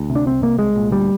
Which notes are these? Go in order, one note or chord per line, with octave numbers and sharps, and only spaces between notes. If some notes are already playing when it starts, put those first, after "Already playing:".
Already playing: D2
C3
D4
C2 C4
C3 A#3
C2 G#3
A#2
D2 G3